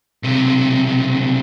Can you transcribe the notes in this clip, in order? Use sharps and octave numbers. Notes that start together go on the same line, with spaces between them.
B1 C3